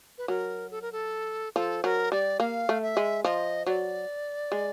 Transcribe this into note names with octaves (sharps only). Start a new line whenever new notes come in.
B4
F#3 A#4
A4
A#4
A4
F3 A4
F#3 A#4
G3 D5
A#3 F5
A3
E5
G#3
F3 D#5
F#3 D5
G#3